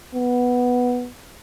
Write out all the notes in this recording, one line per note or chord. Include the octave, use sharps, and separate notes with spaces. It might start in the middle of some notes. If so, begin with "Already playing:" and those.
B3